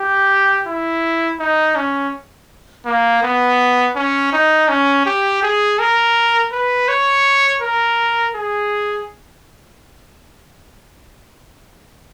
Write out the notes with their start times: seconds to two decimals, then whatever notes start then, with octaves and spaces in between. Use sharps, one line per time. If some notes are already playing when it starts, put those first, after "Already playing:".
Already playing: G4
0.67 E4
1.40 D#4
1.76 C#4
2.86 A#3
3.23 B3
3.96 C#4
4.33 D#4
4.69 C#4
5.06 G4
5.43 G#4
5.79 A#4
6.52 B4
6.88 C#5
7.61 A#4
8.35 G#4